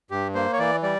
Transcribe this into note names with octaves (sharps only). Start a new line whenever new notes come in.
G2 G4
A#3 C5
C#5
E3 D5
G3 D5